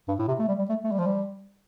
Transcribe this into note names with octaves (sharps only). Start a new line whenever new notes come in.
G2
A2
C3
A3
G3
G3
A3
A3
G3
F3
G3